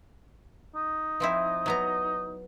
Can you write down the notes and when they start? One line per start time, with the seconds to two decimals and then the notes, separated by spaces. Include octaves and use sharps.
0.75 D#4
1.20 F3 C4 E4
1.66 F#3 B3 A#5